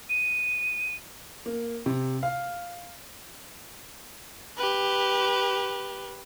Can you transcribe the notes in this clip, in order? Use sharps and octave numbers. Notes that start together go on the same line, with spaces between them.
D#7
A#3
C3
F5
G4 B4